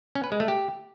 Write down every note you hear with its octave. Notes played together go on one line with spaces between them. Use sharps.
C#4
B4
G#3
A3
G4